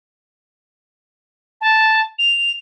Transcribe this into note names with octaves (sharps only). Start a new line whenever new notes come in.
A5
F7